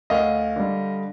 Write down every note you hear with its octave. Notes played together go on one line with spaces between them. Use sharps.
D2 D#5 F5
D3 G3